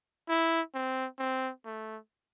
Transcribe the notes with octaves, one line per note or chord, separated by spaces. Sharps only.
E4
C4
C4
A3